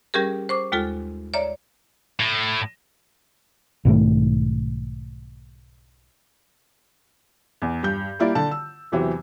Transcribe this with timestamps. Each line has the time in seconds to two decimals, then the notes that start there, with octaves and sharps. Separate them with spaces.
0.14 G3 C#4 G4 G#4 A#4
0.49 C5 C#6 D6
0.72 D#2 G#3 F4 A4
1.34 C#5 D5 E5 A#5
2.20 A2
3.85 B1 G#2 D#3 A3
7.62 E2
7.83 G2 G6
8.19 G3 A#3 E4 D5
8.35 D3 A5
8.51 E6
8.92 E2 C3 E3 F#3 C4